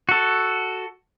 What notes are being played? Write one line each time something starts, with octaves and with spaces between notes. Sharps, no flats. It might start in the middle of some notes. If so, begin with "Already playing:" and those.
F#4 A4